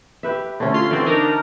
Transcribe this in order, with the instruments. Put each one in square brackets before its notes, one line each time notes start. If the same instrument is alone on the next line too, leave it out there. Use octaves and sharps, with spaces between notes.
[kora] G4 B4 E5
D3 A3 C#4
[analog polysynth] F4 C6
[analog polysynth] E3 C4 [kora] F#4 A4 D5
[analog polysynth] D4 D#4 A#4